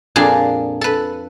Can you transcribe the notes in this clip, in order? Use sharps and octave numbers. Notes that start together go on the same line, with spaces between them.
F2 A#2 D4 F4 G#4 G#5
A4 B4